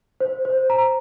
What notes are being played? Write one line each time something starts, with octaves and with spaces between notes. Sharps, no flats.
C5
C5
A#5